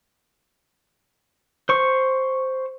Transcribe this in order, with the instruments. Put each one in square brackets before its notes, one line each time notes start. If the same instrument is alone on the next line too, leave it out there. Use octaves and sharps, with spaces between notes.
[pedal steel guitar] C5 C#6